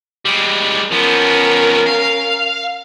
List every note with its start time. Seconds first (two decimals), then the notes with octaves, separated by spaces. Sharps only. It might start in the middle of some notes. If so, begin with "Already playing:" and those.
0.25 G3 G#3
0.91 F3 B3 C#4 A#4
1.87 F5